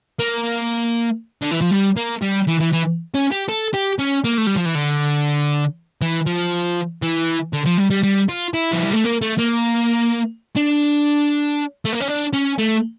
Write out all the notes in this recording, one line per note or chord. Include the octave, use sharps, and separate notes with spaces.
A#3
D3
E3
F3
G3
A#3
G3
E3
E3
E3
C#4
G4
A4
G4
C#4
A#3
A3
G3
F3
E3
D3
E3
F3
E3
D3
F3
G3
G3
G3
F4
E4
F3
G3
A3
A#3
A3
A#3
D4
A3
A#3
C#4
D4
C#4
A3